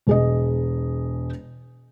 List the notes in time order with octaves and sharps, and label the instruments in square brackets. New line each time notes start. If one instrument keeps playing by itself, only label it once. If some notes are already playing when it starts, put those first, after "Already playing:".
[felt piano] E1 G#4 D#5